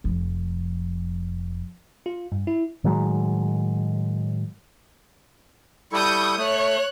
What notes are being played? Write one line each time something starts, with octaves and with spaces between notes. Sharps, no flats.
F1 F2
F4
G2
E4
A2 D#3 F#3 G#3
G3 E4 A4 C#6 D#6 G6
A3 C#5 F#6